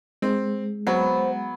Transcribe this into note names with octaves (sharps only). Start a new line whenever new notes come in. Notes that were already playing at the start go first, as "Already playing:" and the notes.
G#3 C4
F#3 B3 C5